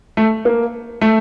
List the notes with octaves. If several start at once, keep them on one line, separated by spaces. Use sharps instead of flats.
A3
A#3
A3